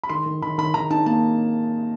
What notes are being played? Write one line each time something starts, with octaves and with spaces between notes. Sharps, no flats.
B5
D#3 C6
D#3
D#3 B5
D#3 B5
D#3 A#5
D#4 A5
A#3 A5